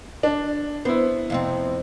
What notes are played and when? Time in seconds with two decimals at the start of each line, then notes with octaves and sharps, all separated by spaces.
0.23 D4
0.85 B3 E4 C5
1.30 F2 C3 C4